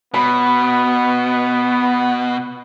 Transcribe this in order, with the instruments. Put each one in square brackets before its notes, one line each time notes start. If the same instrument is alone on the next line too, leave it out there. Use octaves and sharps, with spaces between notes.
[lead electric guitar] B2 [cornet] B3 [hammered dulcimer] B5